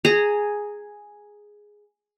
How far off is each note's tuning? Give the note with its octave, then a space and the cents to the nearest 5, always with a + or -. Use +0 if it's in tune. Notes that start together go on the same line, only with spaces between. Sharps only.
G#4 +0 A#5 -20